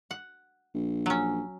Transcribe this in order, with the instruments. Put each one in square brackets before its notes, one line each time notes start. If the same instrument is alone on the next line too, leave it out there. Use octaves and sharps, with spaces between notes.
[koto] F#5
[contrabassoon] A#1
[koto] F#3 C#4